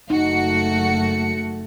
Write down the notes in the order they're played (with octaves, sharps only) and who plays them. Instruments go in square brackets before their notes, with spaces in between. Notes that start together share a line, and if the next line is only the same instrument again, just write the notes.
[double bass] F#1 A3 [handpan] D#4 [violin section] F#4 C#7